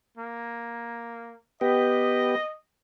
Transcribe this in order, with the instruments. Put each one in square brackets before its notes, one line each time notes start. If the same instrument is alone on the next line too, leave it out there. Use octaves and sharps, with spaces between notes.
[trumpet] A#3
[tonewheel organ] B3 G4 [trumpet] D#5